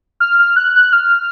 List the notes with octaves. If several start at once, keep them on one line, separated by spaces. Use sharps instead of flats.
F6
F6
F#6
F#6
F6